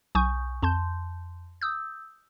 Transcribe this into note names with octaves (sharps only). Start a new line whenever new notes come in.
B1 G#5 C#6 D#6 G6
F2 A5 C6 G6
D#6 E6 G6